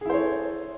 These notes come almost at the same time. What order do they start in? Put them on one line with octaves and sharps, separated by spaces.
G#4 E4 C5 C#5 A4